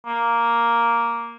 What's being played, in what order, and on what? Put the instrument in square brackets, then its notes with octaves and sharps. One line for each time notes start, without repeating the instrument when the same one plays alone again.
[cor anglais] A#3